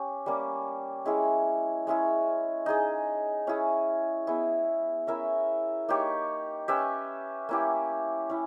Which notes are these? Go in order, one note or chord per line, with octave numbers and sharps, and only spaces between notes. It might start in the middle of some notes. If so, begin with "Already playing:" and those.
Already playing: C#4 G4
G3 A#3 C#4
G#3 C#4 E4 G#4
G#3 C#4 E4 G#4
D#4 G#4 D#5
C#4 E4 G#4
B3 E4 G#4
C#4 E4 A#4 E5
A#3 D#4 G4 C#5
C#4 G4 B4 E5
A#3 C#4 E4 G4
C#4 E4